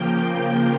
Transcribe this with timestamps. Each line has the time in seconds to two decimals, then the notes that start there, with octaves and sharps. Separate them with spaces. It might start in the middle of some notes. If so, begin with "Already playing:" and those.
Already playing: C#3 F3 A#3 G5
0.23 G5